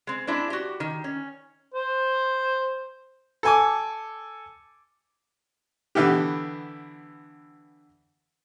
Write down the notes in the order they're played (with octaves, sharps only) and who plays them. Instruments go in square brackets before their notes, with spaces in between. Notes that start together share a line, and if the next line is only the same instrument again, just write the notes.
[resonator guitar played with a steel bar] G#3 C4
G#3 C4 D4 E4
F#4 G4
D#3
C#4
[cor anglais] C5
[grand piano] A4 G#5 D6
[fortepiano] D3 E3 B3 G4